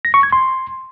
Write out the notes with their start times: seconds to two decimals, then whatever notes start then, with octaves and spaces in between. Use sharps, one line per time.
0.05 A#6
0.14 C#6
0.23 G#6
0.32 C6